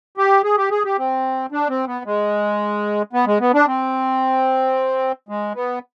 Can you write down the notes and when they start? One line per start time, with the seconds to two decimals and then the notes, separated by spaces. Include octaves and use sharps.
0.18 G4
0.44 G#4
0.57 G4
0.71 G#4
0.85 G4
0.98 C4
1.52 D4
1.69 C4
1.87 B3
2.06 G#3
3.13 B3
3.26 G#3
3.40 B3
3.54 D4
3.67 C4
5.29 G#3
5.55 B3